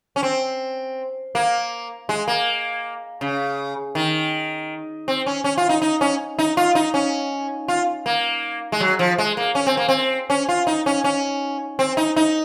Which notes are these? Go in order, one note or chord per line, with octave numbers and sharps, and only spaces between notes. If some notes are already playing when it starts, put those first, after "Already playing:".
C#4
C4
A#3
G#3
A#3
C#3
D#3
C4
C#4
C#4
F4
D#4
D#4
C#4
D#4
F4
D#4
C#4
F4
A#3
G#3
F#3
F3
G#3
A#3
C#4
C4
A#3
C4
C#4
F4
D#4
C#4
C#4
C4
D#4
D#4